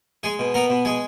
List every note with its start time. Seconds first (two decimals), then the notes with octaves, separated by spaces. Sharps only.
0.23 G#3 G#4 G#5
0.39 B2
0.54 B3 A#4 A#5
0.70 B2
0.85 G#3 G#4 G#5